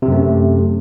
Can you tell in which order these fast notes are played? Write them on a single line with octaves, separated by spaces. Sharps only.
C3 F#2 A3